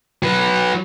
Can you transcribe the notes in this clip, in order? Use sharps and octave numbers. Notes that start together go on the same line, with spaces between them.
F#3 B4